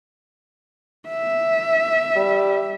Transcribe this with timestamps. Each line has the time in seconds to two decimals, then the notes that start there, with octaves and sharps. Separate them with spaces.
1.08 E5
2.16 G3